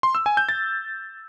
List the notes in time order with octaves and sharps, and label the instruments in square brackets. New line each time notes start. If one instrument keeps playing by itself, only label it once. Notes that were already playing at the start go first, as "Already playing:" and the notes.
[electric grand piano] C6
E6
G#5
G6
A6